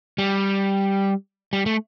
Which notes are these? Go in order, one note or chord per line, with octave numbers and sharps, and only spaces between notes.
G3
G3
A3